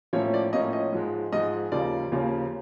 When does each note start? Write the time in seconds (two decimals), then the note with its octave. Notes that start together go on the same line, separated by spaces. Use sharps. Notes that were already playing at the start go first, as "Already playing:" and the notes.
0.13 A2 F3 A#3 C#4 C#5
0.34 D5
0.53 A2 F3 A#3 C#4 D#5
0.73 D#5
0.92 G#2 F3 G#3
1.32 G#2 F3 G#3 D#5
1.72 D#2 C#3 F3 A#3 D5
2.12 D#2 C#3 F3 A#3